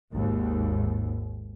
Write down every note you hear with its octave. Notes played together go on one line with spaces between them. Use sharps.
G#1 D#2 G#2